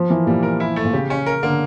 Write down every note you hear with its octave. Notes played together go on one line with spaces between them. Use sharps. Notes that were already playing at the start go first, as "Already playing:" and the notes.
Already playing: F3
E3 A#3
A#2 G3
A#4
E4
A3
A#2
C#3 G4
C#4
A#4
D3 A#3